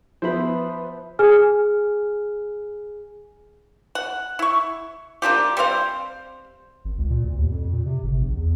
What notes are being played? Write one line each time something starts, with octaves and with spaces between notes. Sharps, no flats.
F3 B3 B4 C5 E5 B5
G#4 G#5 F6
F#5
E4 C#6
A#3 D4 F4 G4
G3 C4 C5 F5
G#1
C#2
A#2
D2
D#2
F2
A#2
C3
G1
A#1
E2